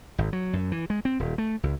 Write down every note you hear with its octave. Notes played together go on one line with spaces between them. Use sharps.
G#1
F#3
F#2
E3
G#3
C4
D#1
A3
C#2